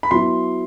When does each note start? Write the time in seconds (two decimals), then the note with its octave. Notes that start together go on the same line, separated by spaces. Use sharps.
0.03 B5
0.11 F#3 B3 E4 C6